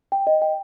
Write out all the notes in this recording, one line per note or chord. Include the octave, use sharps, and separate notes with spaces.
G5
D#5
G5